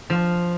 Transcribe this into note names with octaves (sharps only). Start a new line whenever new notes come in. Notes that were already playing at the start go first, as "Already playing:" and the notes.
F3